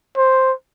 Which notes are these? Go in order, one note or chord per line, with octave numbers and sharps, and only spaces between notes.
C5